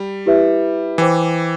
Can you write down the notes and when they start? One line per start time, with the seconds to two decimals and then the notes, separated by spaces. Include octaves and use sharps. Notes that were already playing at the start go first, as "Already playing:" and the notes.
Already playing: G3
0.26 E4 G4 B4 E5
0.98 E3 C5 G5 D6